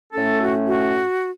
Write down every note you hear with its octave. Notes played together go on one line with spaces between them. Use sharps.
A2 A3 C#4 A4
F#4
F#4